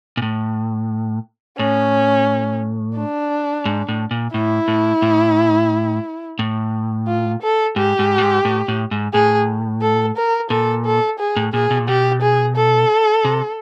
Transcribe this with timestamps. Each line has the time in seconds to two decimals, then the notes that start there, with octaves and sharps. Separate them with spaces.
0.17 A#2
0.22 A2
1.59 A2 C#4
2.97 D4
3.65 G#2
3.89 A2
4.11 A#2
4.34 A2 E4
4.68 A2
5.02 A2
6.39 A2
7.08 F4
7.42 A4
7.76 G#2 G4
7.99 G#2
8.18 A2
8.22 G#2
8.45 A2
8.68 A2
8.91 G#2
9.13 A2 G#4
9.82 A4
10.17 A#4
10.50 A#2 A4
10.85 A4
11.19 G#4
11.36 A2
11.53 A#2 G#4
11.71 B2
11.79 A#2
11.88 B2 G4
12.22 G#4
12.56 A4
13.25 C3